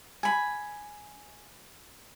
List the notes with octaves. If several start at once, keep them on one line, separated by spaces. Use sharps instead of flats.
G#5 B5